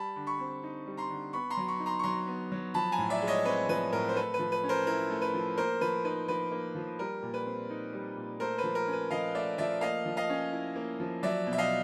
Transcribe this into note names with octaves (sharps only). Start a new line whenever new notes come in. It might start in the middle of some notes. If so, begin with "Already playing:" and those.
Already playing: G3 A5 B5
D3
B5 C#6
C4
D#4
G3
A#5 C6
D3
B3 B5 C#6
A#5 C6
F#3
B5 C#6
D#4
A#5 C6
C#6
F#3 A#5 C6
B3
F#3
F3 A5 B5
G#5 A#5
A2
D5 E5
G#3
C#5 D#5
C4 B4 C#5
F3 B4
A2 A#4
C5
A3 B4
B4
F3
B4
C#4
A#4 C5
E4 A#4
A3
B4
F3
A#3 A#4 C5
F3 B4
D#4 B4
F3 B4
A#3
F3
G3 A#4
A#2
B4
C4
D#4
G3
A#2
A3 A#4 C5
B4
F3
A#4
C#4
B4
F3 D#5 F5
A3 D5 E5
F3 D5 E5
A#3 D#5 F5
F3
D#5 F5
C#4
E4
A#3
F3
F#3 D5 E5
B2
E5
D#5 F5